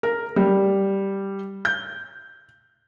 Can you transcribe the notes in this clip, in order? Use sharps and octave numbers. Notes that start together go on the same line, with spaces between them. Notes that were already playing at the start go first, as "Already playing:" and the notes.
A#4
G3
G6